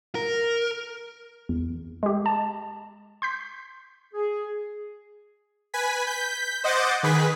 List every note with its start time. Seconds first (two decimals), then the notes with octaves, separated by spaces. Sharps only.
0.15 A#4
1.49 E2
2.03 G#3 G4
2.26 A5
3.22 C6 G6 B6
4.14 G#4
5.74 B4 G#5 B6
6.07 G6 B6
6.64 C5 D#5 F#5 D6 G6 A6
7.03 D#3 G#4 B4 B6